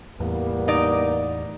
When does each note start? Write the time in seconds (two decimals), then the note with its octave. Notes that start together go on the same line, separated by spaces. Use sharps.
0.20 E2 A2 G3 A#3 B3
0.68 D#4 D5